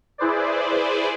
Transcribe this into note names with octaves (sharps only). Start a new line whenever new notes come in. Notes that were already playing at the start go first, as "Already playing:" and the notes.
E4 G#4 B4 C5 D5